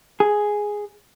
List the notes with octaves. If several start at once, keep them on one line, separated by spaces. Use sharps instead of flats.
G#4